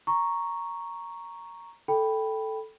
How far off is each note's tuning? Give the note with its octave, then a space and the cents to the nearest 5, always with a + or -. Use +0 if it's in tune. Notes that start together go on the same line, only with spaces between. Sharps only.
A#5 +0 C#6 +0
A4 +0 G5 +0 B5 +0